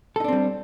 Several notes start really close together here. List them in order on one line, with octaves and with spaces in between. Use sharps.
A4 D#4 D4 C4 G3